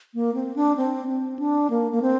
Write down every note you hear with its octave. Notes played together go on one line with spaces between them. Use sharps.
A#3
C4
D4
C4
C4
D4
A#3
A#3
C4